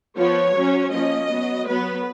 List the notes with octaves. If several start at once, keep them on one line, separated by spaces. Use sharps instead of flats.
F3 B3 C#5
F#3 C#4
F3 A#3 C#4 D#5
F#3 B3
F#3 B3 B4